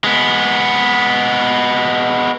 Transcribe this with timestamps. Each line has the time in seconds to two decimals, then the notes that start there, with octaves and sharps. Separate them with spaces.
0.04 G#3 B3